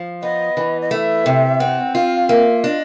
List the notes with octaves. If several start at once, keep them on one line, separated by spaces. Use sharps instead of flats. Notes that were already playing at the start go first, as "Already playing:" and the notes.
Already playing: F3
B3 D#5
E3
D#5
A3 E5
C3
C4 F#5
F4 F5
A#3 E5
D4 D#5